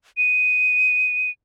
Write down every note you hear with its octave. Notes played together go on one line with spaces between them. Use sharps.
D#7